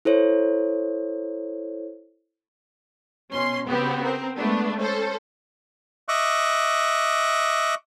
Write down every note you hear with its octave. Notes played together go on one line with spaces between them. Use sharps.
E4 A4 C5 C#5
B2 C#4 C6
C#3 B3 C4 F#4 G4
C4 A#4
G#3 A3 B3 D4
C#4 A4 C5
D#5 E5 C#6 D6 F#6